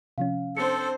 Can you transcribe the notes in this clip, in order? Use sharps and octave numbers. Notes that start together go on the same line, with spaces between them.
C3 F3 C#4 F5
C4 D4 A4 C5 C#7